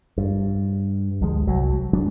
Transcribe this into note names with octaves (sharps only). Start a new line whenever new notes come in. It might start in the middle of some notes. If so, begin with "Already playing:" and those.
G2
D2 F3 G#3
C2 F#3
F#3 G#3 D4